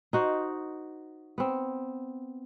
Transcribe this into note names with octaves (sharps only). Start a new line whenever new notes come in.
D#4 F#4 C5
B3 C4